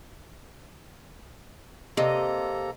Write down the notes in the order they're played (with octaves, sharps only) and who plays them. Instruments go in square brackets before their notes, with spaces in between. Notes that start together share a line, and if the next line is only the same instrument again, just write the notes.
[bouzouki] C3 [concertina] A#3 A4 A#5 [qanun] D#5